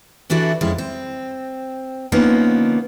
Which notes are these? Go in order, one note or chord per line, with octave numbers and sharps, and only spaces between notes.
E3 D4 E4 F#4 A4 D5
F2 G#3 C#4 E4
C4
D3 F3 A#3 B3 C#4 D#4